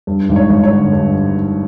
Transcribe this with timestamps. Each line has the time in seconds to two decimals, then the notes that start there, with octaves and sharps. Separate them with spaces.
0.07 G2
0.29 G#1
0.36 C#5
0.49 G#1
0.64 C#5
0.71 D3
0.93 G2